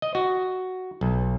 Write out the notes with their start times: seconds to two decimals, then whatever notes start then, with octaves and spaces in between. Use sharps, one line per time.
0.02 D#5
0.15 F#4
1.01 B1